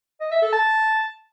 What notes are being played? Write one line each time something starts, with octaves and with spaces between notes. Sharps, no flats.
D#5
E5
A4
A5